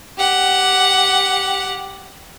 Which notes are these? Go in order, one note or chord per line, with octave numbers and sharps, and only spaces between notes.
G4 F#5